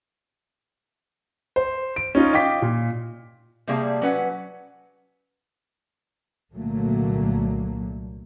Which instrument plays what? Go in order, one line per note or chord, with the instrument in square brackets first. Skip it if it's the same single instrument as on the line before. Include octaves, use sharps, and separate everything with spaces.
[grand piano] C5
D7
C#4 D#4 F4
D#5 F5 G5 D6 B6
A#2
[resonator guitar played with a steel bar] C3 G3 A#3 G#4 F5 A5
F#3 C#4 B4 F#5
[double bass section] C2 A#2 D3 F#3 A3 A#3